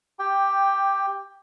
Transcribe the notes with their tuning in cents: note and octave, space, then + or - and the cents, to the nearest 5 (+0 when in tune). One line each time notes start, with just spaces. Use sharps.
G4 +0 G5 +10